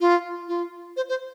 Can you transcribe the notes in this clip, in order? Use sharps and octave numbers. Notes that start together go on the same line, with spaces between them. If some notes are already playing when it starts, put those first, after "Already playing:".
F4
F4
C5
C5